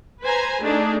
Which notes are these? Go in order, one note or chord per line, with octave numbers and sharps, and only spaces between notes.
B4 C5 G#5 A#5
A3 D4 D#4 G#4